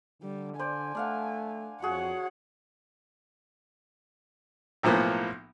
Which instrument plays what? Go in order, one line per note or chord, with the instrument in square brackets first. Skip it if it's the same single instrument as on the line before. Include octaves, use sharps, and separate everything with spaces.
[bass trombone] D3 [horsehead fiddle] G3
[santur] C5 D5 [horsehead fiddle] G#5
[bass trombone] A3 [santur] D4 F5 F#5
[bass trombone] F2 [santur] F#4 G#4 [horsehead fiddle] C#5 F#5
[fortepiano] B1 A2 F3 A#3 B3